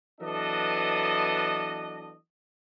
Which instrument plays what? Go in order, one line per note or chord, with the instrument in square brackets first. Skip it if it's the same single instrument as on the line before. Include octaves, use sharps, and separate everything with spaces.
[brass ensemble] E3 F#3 B3 D4 A4 D#5